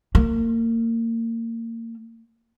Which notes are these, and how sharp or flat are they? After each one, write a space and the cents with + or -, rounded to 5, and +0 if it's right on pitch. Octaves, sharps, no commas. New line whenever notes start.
A#3 -30